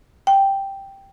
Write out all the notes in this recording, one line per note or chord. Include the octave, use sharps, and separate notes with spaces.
G5